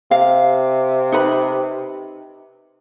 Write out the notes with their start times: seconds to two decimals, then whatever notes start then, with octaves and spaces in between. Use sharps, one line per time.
0.11 C3 F5
1.12 D#4 B4 B5